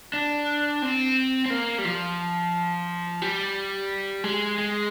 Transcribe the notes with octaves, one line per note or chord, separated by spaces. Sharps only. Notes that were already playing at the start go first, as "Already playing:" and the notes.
D4
C4
C4
A#3
G3
F3
G3
G#3
G#3